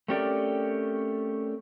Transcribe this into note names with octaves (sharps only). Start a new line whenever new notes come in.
A3 C4 C#4 G4 A#4 D5